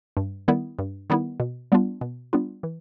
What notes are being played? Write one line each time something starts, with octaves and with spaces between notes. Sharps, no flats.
G2
D#3 G3 B3 E4
G2
D#3 G3 B3 E4
B2
G3 B3 D4 F4
B2
G3 B3 D4 F4
E3